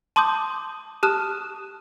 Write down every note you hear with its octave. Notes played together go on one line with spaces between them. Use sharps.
A5 C6 D6 D#6 G6
G4 A5 D#6 F6 F#6 E7